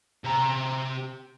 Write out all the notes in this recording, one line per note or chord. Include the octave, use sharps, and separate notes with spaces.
C3 A#5